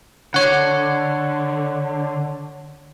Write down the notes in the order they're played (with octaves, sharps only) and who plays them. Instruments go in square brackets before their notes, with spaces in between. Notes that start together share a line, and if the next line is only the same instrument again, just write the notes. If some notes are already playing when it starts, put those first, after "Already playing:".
[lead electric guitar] D3 [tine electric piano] C#5 F#5